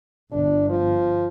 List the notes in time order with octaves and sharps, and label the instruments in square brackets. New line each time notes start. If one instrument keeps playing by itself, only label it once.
[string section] G1 [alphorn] D4
[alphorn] F3